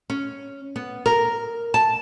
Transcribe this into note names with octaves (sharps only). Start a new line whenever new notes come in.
C#4
B3
A#4
A5